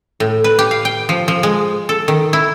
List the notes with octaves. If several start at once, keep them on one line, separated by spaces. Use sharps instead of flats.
A2
B4
G4
F5
G5
F3
F3
G#3
A4
D#3
E4